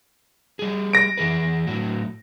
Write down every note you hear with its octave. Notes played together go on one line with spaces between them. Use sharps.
G3 G#4
A#6 D7
E3 G#4 B4
A2 F#3